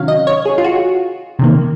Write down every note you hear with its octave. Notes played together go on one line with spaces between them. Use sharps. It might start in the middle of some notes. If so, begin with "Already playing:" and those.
Already playing: C3 D#3 F#3 C#4 F5
D#5
C#5
G#4
F4
F#4
C3 D#3 A#3